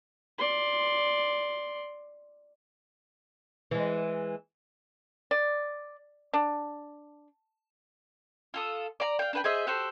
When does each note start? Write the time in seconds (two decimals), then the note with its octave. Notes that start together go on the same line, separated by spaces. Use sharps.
0.39 D5 C6
3.71 E3 G#3
5.31 D5
6.34 D4
8.54 F4 A4 D#6
9.00 D5 A#5
9.19 F5 G5
9.33 D4 B4 G5
9.44 G#4 C5 D#5 E5
9.67 F#4 G4 A4 C5